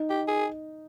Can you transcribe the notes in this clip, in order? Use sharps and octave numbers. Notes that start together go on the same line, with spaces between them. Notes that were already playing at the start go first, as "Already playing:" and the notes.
Already playing: D#4
G4
G#4